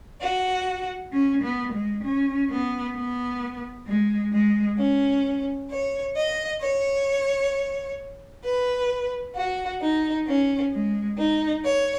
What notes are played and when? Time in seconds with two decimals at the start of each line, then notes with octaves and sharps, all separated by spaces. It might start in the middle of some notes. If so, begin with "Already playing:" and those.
0.21 F#4
1.12 C#4
1.43 B3
1.73 G#3
2.03 C#4
2.50 B3
2.95 B3
3.86 G#3
4.32 G#3
4.78 C#4
5.70 C#5
6.15 D#5
6.61 C#5
8.43 B4
9.35 F#4
9.81 D#4
10.27 C#4
10.72 G#3
11.18 D#4
11.64 C#5